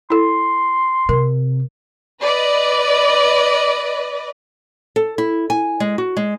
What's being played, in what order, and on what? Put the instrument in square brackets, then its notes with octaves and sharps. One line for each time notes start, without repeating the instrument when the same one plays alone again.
[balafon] E4 A4 [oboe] C6
[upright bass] C3 [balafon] A#4
[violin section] B4 D5 D#5
[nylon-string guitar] A4
E4
G#5
G#3
F#4
G#3